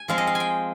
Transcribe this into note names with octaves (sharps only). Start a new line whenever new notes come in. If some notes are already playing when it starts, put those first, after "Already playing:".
Already playing: G#5
F3 G#3 C4 F5
D#5
F5
G#5
G5